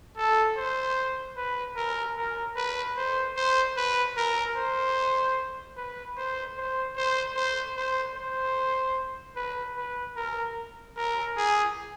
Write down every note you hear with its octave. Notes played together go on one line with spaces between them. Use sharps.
A4
C5
B4
A#4
A#4
B4
C5
C5
B4
A#4
C5
B4
C5
C5
C5
C5
C5
C5
B4
B4
A#4
A#4
G#4